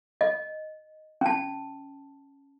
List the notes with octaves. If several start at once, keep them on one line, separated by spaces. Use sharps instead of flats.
D#5
C#4 A5